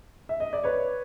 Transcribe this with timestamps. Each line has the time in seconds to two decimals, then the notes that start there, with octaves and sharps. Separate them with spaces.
0.29 E5
0.40 D#5
0.53 D5
0.64 B4 C#5